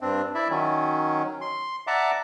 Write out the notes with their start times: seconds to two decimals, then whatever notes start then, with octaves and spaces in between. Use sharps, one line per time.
0.01 G2 C4 D4
0.35 E4 D5 E5
0.50 D#3 F#3 C#4
1.41 C6
1.87 D5 E5 F#5 A5 A#5 D6